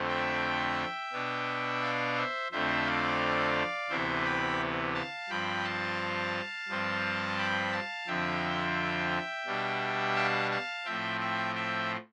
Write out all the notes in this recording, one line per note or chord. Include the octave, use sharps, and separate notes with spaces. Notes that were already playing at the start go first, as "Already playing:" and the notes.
Already playing: F2 D3 A3 C4
E5 G5
B2 B3 D4
D5 F5
C5 E5
F2 D3 A3 C4 C5 E5
D5 F5
D2 C3 E3 B3 C5 E5
G5 B5
F5 A5
G2 F3 C4 G5 B5
F5 A5
G2 F3 C4
G5 B5
F5 A5
F2 D3 F3 C4 E5 G5
B2 G3 D4
F5 A5
F5 A5
A2 F3 C4 E5 G5
E5 G5
E5 G5